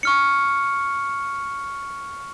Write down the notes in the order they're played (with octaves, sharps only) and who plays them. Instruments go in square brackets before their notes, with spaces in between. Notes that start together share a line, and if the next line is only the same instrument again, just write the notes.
[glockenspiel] C#6 F6 C#7